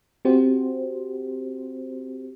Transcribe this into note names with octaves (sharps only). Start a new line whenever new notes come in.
C4 F#4 G4 C5